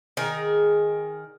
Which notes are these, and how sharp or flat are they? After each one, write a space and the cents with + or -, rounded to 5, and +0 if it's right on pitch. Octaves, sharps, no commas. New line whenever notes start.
D#3 +0 G#4 +0 A#5 +20